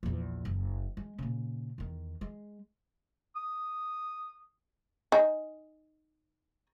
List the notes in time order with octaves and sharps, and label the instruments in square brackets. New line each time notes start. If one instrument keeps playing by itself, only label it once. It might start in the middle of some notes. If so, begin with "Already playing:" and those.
[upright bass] A#1 E2
F#1
G#3
A#2 C#3
E2 D#3
G#3
[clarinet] D#6
[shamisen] D#4 G#5